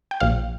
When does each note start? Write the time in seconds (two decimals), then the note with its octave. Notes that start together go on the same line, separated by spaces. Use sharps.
0.11 G5
0.20 A#1 F5